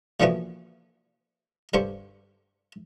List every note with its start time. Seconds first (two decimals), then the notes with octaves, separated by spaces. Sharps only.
0.20 A#2 D3 E3 F3 B3 F#4
1.74 G2 D3 G4 C5 C#6